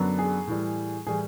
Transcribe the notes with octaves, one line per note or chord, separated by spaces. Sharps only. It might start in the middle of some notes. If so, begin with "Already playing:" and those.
Already playing: F#2 D3 F#3 B3 D4
G#4
A2 E3 G3
A2 E3 G3 G#4